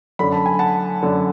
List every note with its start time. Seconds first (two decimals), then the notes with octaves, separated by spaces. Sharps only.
0.19 F#2 D3 B5
0.32 A5
0.46 G#5
0.59 F#5 A5
1.03 F#2 D3